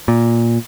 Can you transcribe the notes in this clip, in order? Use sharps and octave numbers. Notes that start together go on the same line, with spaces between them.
A#2